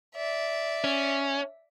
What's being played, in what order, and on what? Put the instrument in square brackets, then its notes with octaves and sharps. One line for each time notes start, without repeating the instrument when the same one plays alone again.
[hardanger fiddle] D5 E5
[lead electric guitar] C#4